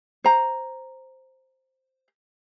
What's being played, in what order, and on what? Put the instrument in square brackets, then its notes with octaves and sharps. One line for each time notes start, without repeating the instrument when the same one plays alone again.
[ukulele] C5 A#5